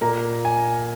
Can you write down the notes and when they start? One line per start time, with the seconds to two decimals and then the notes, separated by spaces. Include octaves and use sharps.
0.01 A#2 A#3 A#5
0.45 G#5